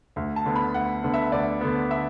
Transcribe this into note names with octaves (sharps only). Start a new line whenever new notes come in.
D2
A5
D3 B3
B5
D2 F#5
D3 B3
E5
D2 D5
D3 B3
E5